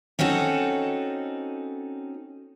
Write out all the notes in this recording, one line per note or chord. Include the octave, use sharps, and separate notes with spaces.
C4 C#4 D#4 F#4 A4